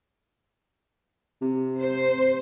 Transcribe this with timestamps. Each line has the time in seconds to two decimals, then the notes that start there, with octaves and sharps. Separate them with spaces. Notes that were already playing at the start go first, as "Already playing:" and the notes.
1.42 C3
1.80 C5